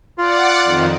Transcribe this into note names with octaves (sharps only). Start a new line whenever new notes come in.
F4 D5 F#5
F2 D#3